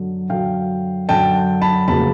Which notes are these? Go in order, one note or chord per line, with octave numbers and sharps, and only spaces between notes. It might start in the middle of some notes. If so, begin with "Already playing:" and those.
Already playing: F#2 D3 F#3
F#2 D3 F#3 F5 G5
F#2 D3 F#3 G5 A5
A5 B5
F1 C#3 F#3 A#3 A5 B5